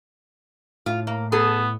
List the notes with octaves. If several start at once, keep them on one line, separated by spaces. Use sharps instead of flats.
A2 F4
A#3
B3 G#4 A4